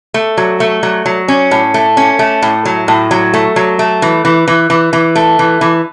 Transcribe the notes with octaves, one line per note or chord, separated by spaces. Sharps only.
A3
F#3
A3
F#3
F#3
C#4
A2
A3
C#4
A3
A2
F#3
A2
F#3
A3
F#3
A3
E3
E3
E3
E3
E3
A3
E3
E3